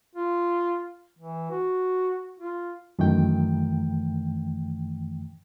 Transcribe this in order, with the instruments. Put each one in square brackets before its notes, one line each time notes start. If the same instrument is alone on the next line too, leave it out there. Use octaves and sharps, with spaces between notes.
[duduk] F4
E3
F#4
F4
[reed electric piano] F#2 D#3 E3 A3 G5